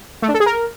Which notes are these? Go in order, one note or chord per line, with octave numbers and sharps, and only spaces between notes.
A3
D4
A4
G#4
A#4